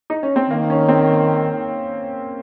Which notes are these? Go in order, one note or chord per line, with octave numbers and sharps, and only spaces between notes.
D#4
C#4
C4
D#3 A#3
C#4
C4